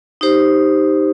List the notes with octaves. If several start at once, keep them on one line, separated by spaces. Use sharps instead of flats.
D#4 G4 C5